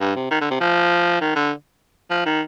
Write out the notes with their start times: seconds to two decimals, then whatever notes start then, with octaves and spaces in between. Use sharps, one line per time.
0.01 G2
0.16 C3
0.31 D#3
0.41 D3
0.51 C3
0.60 F3
1.21 D#3
1.36 D3
2.10 F3
2.25 D#3